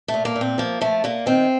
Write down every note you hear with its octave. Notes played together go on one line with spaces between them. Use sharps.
A3
A#2
A#3
A#2
C4
F3 A#3
F3 A3
A#2 A#3
D#3 C4